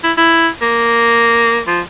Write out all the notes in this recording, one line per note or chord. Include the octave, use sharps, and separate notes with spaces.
E4
E4
A#3
F3